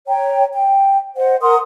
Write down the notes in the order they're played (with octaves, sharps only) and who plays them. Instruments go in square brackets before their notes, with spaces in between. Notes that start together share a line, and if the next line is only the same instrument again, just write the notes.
[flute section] C#5 G5 A#5
G5
C5 D#5 F#5
A#4 F#5 C6 D#6